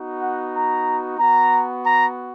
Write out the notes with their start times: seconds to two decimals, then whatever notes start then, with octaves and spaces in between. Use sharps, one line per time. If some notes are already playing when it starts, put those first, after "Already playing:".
Already playing: B3 D#4 F#4
0.20 F#5
0.52 A#5
1.18 B3 F#4 A#5
1.84 A#5